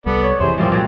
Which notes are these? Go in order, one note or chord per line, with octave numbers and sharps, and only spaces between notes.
C2 G3 B3 A4 D5
C#5
F2 C3 E3 G#4 C5
A#2 F3 G3 G#3 C4
A#2 F#3 G#3